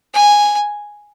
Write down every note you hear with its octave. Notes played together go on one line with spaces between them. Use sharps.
G#5